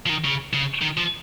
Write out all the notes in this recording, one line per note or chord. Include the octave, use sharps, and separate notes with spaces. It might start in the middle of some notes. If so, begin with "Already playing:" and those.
F3
D#3
C#3
C#3
D#3
F3